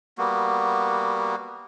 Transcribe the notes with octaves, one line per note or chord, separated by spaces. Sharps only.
G3 A#3 B3 F#4